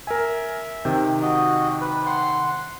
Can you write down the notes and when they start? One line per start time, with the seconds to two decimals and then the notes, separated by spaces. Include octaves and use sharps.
0.07 A#4 E5 G#5
0.85 C3 D#3 G5
1.22 F#4 D#5
1.81 B4
2.06 F#5 C6